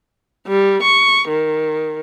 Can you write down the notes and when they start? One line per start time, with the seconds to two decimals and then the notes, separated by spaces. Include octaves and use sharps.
0.48 G3
0.82 C#6
1.29 D#3